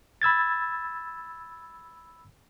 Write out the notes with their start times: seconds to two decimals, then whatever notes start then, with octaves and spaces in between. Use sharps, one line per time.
0.22 B5 E6 G#6 A6